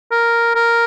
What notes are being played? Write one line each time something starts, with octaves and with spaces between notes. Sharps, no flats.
A#4
A#4